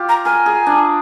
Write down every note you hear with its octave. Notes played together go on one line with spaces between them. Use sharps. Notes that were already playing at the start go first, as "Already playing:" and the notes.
Already playing: F4 G4
A#5
A#4 G#5
G#4
D4